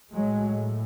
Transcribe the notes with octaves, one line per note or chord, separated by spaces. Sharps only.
A2 F#3 G#3